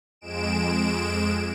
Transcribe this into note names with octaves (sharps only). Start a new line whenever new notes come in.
F2 G#3 D7 E7